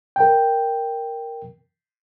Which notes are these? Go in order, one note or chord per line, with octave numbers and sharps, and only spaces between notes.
A#4 G5